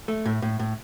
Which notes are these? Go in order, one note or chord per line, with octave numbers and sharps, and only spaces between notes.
A3
A2
A2
A2